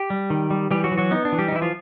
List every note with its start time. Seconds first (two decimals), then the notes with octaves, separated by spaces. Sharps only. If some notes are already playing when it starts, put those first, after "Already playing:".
Already playing: G4
0.10 G3
0.30 D#3
0.51 G3
0.71 E3 G3 G4
0.84 F#3 F#4
0.92 E3
0.98 F#3 F#4
1.11 B3 D#4
1.25 D4
1.32 E3
1.39 G3 G4
1.48 D#4
1.52 E3 E4
1.62 F3 F4